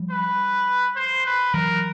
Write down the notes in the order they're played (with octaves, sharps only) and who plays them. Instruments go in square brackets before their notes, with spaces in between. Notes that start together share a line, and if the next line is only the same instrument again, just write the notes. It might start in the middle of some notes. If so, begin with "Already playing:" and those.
Already playing: [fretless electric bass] F3 G3
[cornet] B4
C5
B4
[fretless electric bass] E3 F#3 [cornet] A#4